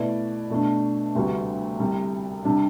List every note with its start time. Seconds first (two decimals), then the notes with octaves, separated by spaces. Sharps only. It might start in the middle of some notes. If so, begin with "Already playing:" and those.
Already playing: B2 A3 E4 B4 D5
0.50 B2 A3 D4
1.15 D2 C3 G3 B3 F#4
1.80 C2 C3 G3
2.45 C3 G3 D4